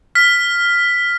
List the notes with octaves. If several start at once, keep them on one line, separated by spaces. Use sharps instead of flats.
F6 B6